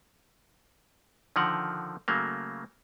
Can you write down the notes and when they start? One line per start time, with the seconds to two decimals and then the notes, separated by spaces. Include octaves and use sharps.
1.36 D3 D#3 F3 A#4 F#5
2.08 C#3 F#3 A3 A#3